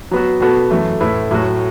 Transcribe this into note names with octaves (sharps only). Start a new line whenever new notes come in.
F#3 B3 F#4
B2 B3 F#4 A4
F#2 E3 A3
A2 A3 E4 B4
A2 F#3 A3 F#4